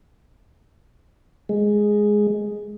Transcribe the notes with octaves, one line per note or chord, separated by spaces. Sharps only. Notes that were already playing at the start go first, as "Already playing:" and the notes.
G#3